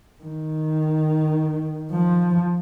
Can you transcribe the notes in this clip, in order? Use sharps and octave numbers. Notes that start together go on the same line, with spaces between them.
D#3
F3